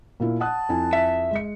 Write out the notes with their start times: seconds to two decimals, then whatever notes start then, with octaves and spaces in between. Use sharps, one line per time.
0.20 A#2 A#3 E4
0.41 F#5 A5 D#6 F#6
0.69 F2 E4 G#5
0.93 E5
1.31 G#3 C#7